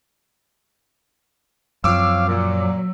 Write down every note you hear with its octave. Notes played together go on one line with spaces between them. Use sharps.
F#2 F3 C4 C#5 F5 D6 E6
A#2 F#3